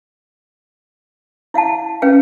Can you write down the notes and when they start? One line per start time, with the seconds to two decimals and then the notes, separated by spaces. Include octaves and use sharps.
1.54 E4 F5 F#5 A5
2.02 C#4 B4 F5 G5